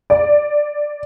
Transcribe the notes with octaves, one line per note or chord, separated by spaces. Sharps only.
D5